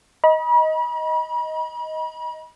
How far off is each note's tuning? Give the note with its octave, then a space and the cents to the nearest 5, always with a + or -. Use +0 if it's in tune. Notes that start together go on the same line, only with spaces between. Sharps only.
D#5 +15 B5 -40